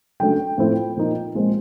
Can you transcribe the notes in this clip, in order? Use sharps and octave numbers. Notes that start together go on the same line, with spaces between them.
C#3 F#3 A3 D4 G5
A2 F3 A3 C4 E4
A#2 F3 A#3 D#4
A#2 F3 G#3 C4